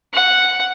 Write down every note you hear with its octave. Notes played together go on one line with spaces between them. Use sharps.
F#5